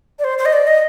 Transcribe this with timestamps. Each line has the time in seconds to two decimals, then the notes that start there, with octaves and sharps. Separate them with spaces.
0.19 D5
0.24 C5
0.38 C5
0.45 D#5
0.53 D5
0.67 D#5